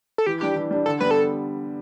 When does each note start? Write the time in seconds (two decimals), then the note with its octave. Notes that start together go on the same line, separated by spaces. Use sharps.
0.18 A4
0.26 E3 G4
0.41 G3 D4 G4
0.56 E3
0.71 G3 D4
0.86 D3 A4
1.00 G3 B3 B4
1.11 A4